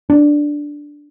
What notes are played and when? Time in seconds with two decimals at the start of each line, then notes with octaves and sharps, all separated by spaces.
0.10 D4